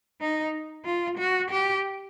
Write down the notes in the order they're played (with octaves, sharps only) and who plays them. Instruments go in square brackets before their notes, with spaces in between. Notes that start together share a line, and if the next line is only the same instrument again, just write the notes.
[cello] D#4
F4
F#4
G4